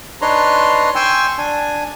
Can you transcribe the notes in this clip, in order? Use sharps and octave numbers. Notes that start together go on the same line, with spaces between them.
D4 D#4 B4 C#5 A#5 C6
G5 G#5 C6 C#6 E6
D4 G#5